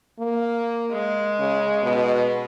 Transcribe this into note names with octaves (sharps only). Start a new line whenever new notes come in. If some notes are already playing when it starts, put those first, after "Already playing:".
A#3
G#3
C#3
B2